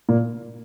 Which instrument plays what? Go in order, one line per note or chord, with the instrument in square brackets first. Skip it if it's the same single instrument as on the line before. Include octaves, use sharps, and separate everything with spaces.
[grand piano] A#2 A#3